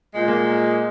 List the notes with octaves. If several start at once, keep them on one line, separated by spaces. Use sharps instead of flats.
A#2 G#3
A#3